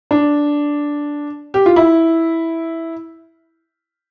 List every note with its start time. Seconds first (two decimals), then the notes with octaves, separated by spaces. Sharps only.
0.11 D4
1.54 G4
1.66 F4
1.76 E4